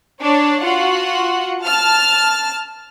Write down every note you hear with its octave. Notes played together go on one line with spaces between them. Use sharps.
D4 C#5
F4 F#4 F#5
A5 F6